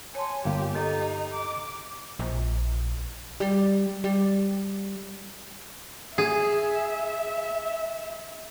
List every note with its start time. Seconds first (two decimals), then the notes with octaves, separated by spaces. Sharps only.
0.15 C#5 G#5 A5 C6
0.45 G1 A#3 F4 G4
0.75 D#4 G4 A4 D#5
1.34 D6
2.19 A#1
3.40 G3
4.04 G3
6.18 G#4 E5